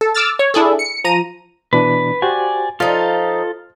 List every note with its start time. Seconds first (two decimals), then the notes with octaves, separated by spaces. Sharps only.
0.01 A4
0.15 D6 E6 F6 A6
0.39 C#5
0.54 D4 E4 G#4 A4
0.79 C#7
1.04 F3 A#5 D#7
1.73 B2 E3 D4 B4
2.22 F#4 G4 C5 D5 G#5
2.80 F3 D#4 F4 A4 F6